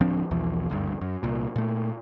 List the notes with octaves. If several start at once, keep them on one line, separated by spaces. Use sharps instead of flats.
D1 F3 C4 D4
B1 E2 E3 F3
F#1 D2 G2
F#2
C2 A#2
A#2 A3